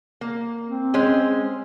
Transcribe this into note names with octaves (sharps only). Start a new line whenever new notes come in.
A#3
C4
G#3 C#4 C5